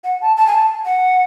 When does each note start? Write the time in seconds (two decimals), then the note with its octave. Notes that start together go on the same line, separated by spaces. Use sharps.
0.04 F#5
0.21 A5
0.37 A5
0.47 G#5
0.54 A5
0.85 F#5